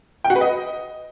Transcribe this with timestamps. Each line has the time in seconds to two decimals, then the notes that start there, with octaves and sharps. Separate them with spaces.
0.24 G5
0.30 F#4
0.36 B4
0.41 D#5